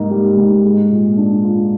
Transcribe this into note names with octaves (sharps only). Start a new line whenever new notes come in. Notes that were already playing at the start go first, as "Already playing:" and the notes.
Already playing: G#2 G3 A#3 D#4
G3
G#2
G#3
A#2
D4
F4